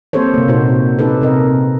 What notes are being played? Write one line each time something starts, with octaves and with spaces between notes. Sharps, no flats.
A#3 C4 G4 A4 C5 C#5
C3 A#3
A#2 D#4 F#4 C5
C4 C#4 D#4 G4 A4 B4
C3 C4 A#4 D#5